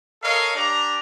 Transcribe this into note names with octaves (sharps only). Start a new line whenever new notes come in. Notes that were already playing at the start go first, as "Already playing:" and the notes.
A4 A#4 C#5 D#5 F5
D4 G4 D5 A#5